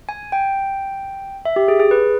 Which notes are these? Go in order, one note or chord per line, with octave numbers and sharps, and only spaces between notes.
G#5
G5
E5
G4
G#4
G#4
B4